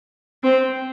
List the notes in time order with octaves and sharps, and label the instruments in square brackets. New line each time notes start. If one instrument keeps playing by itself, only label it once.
[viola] C4